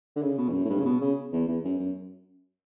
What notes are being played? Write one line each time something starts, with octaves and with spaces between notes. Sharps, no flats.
D3
C#3
B2
E2
F#2
A2
G2
C#3
B2
C#3
E2
E2
F#2
F#2